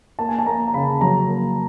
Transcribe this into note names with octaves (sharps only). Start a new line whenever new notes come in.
A#3 A5
G#5
A5
A#3 A#5
A#5
C#3 B5
F#3 A#5
A#3